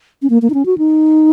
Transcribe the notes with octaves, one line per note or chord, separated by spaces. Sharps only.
C#4
A#3
A#3
D#4
C#4
F#4
D#4